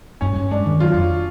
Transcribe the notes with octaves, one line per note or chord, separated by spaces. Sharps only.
G2 C#4
G2
G#3 D4
D#3
F#3 F4
F2